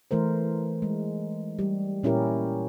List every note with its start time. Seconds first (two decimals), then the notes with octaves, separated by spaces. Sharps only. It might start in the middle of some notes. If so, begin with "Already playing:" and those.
0.11 E3 A3 A#4 C5
0.82 G#3
1.59 G3
2.03 A#2 C#4 E4 G4 A#4